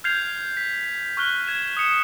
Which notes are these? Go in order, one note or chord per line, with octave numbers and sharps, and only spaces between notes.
F6 G6 G#6 C7 F7
B6
C#6 F6 F#6 G7
G#6 E7
D#6 C#7 E7